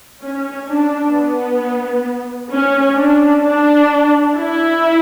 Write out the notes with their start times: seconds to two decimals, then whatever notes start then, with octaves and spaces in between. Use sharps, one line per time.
0.21 C#4
0.68 D4
1.13 B3
2.51 C#4
2.97 D4
3.43 D4
4.35 E4